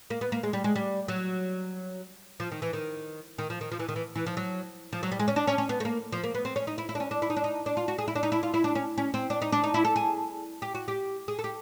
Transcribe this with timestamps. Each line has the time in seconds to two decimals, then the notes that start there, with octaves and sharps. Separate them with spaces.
0.10 A#3
0.21 B3
0.32 A#3
0.43 G#3
0.53 G3
0.64 G#3
0.76 G3
1.08 F#3
2.40 F3
2.52 D#3
2.62 E3
2.73 D#3
3.38 D#3
3.50 F3
3.61 D#3
3.72 F3
3.79 E3
3.89 D#3
3.96 E3
4.16 E3
4.26 F3
4.37 F#3
4.93 F3
5.03 F#3
5.12 G3
5.19 G#3
5.28 C#4
5.36 D4
5.47 C#4
5.58 C#4
5.69 B3
5.80 A3
5.85 A#3
6.12 F3
6.24 A#3
6.35 B3
6.45 C4
6.56 C#4
6.67 D#4
6.78 E4
6.89 E4
6.95 D4
7.00 C#4
7.11 D4
7.22 E4
7.30 D#4
7.36 D4
7.44 D#4
7.66 D4
7.77 F4
7.88 F#4
7.98 G#4
8.08 E4
8.15 D4
8.23 D#4
8.32 E4
8.43 F4
8.54 E4
8.64 D4
8.75 C#4
8.98 C#4
9.14 C4
9.30 D4
9.42 D#4
9.52 D4
9.64 D#4
9.74 E4
9.85 A4
9.96 G#4
10.62 G4
10.75 F#4
10.88 G4
11.28 G#4
11.39 A4
11.44 G4